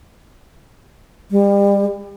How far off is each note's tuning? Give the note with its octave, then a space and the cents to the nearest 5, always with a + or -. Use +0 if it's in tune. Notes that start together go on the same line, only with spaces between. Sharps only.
G3 +35